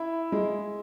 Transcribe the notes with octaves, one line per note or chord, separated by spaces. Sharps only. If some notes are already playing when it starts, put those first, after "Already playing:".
Already playing: E4 E5
G#3